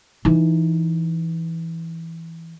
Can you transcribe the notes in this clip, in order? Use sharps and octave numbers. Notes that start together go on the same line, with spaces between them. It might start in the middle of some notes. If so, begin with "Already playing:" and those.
E3 D#4